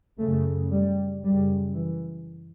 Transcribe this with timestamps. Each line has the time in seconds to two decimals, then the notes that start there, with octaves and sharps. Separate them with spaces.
0.20 F#2 C#3 A3
0.71 G3
1.23 F#2 C#3 G3
1.75 E3